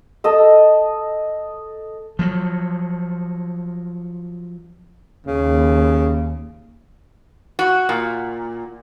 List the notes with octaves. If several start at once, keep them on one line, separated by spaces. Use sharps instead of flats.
A4 D#5 E6
F3 F#3
D#2 C#3
F#4
A#2